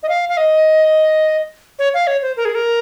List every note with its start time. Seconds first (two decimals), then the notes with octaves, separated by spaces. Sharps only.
0.03 D#5
0.09 F5
0.29 F5
0.37 D#5
1.79 C#5
1.94 F5
2.07 C#5
2.22 C5
2.37 A#4
2.45 G#4
2.55 A#4